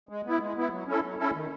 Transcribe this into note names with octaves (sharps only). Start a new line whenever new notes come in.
G#3
B3 E4
G#3
B3 E4
F#3
C#4 E4 A4
F#3
C#4 E4 A4
D#3